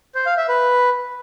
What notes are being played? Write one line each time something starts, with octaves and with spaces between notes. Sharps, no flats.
C5
F5
E5
B4